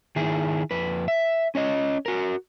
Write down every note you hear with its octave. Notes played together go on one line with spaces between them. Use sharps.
D#3 E4 G#4
F2 B4
E5
C#4 C#5 D#5
F#4 A#4